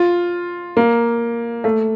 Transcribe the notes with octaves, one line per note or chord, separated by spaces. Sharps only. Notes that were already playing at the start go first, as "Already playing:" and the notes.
Already playing: F4
A#3
A3